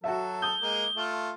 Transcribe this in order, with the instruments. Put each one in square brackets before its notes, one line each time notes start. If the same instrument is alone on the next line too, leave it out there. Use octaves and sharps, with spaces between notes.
[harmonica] F#3 A4 [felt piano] F#4 E5
[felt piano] D#6 G6 [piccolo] G7
[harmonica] G#3 A#3
A3 F4